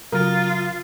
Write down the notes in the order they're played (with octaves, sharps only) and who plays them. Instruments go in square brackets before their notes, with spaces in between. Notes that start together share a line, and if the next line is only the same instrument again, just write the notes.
[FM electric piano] C#3 F#3 D#6 [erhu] F4 [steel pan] A#4